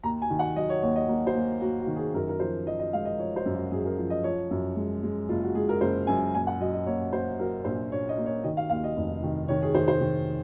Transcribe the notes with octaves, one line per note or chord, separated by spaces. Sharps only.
D#2 A#5
G#5
D#3
F#5
F#3 D#5
C#5
D#2 C#5
D#5
A#3
C5
A#3
A#3 F#4
F#4
D#3
G#4
F#2 A#4
A#4
F3 C5
F3 D#5
D#5
G#3 F5
D#5
F3 C#5
C5
F#2
F#4
F#2 G#4
A#4
F3
D#5
F3 C#5
F#2
G#3
G#3
F#1 F4
F#4
G#3 G#4
A#4
F#1 C5
F#2 G#5
A#2 G#5
F#5
F#3 D#5
D#5
A#3 C#5
A#3 C5
F#3 A#4
A#1 C5
A#1 C#5
D#5
A#3
C#5
D#3 D#5
F5
D#2 F5
D#5
F1
D#3
D#3 C#5
G#4
D#3 C5
C5
D#3